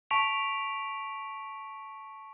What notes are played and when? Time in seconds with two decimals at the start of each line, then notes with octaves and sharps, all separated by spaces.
0.11 A5 C#6 B6 D7 F7